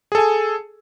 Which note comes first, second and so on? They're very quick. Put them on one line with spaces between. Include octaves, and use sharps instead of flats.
G#4 A4 G#5